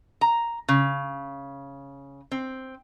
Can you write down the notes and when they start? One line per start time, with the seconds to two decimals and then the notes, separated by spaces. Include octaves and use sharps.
0.21 A#5
0.68 C#3
2.31 C4